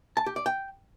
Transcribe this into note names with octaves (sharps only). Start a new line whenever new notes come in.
A5
G4
D5
G5